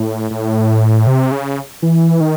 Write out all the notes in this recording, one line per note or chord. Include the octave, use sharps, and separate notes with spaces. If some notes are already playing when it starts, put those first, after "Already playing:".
Already playing: A2
A2
C3
C#3
E3
D#3